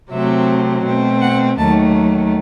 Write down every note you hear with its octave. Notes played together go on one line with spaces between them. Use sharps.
C3 F#3 A3 C4 E5
B2 A3 C4
F#5
D#2 D#3 F#3 A3 A5